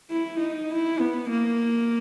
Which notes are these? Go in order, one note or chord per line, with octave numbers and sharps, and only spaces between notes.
E4
D#4
E4
B3
A#3